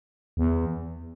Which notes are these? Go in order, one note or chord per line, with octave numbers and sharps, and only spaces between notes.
E2